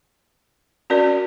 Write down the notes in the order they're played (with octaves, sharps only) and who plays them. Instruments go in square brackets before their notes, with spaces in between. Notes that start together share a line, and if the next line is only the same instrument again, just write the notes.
[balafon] C#4 F#4 A#4 D5